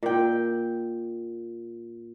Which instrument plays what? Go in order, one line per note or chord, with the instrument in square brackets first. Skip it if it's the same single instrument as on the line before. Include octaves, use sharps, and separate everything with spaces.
[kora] A#2 G5